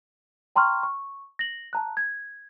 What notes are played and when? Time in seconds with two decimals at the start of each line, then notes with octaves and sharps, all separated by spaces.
0.56 G5 A#5 C6 C#6 F6
0.83 C#6
1.39 A#6 F#7
1.73 A5 A#5 F#6
1.97 G#6